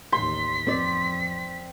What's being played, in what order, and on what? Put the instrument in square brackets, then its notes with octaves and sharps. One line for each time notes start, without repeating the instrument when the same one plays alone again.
[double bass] A1 D#2 [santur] C6 [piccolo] B6
[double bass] F2 [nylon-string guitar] C4 D5